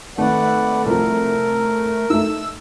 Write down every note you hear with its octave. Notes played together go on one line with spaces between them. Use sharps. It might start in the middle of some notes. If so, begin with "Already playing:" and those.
G#1 A3 B4 D5 F#5
C2 F3 A#4
A3 D#4 E6